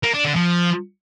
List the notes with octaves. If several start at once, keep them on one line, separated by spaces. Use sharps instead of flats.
A#3
D4
D3
F3